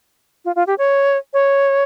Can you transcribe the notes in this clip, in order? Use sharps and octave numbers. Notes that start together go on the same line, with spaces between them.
F4
F4
G4
C#5
C#5